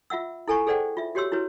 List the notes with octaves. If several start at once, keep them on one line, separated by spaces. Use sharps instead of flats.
F4 E5 F#5 E6
E4 A4 G#5 A#5 C#6
G#4 A4 C5 D5 F#5 G5
F4 E5
F#4 G4 C#5 C6 E6
E4 F#4 B4 C#5